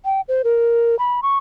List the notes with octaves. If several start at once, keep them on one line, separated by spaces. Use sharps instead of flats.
G5
C5
A#4
B5
C#6